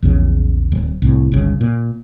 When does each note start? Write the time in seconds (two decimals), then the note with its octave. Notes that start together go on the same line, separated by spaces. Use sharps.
0.02 A#1 E2 C#3
0.72 D1
1.02 C2 A2
1.32 G1 C#2 C#3
1.61 A#2